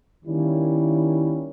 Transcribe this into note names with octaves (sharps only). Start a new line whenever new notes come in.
D#3 G3 A#3 C#4 E4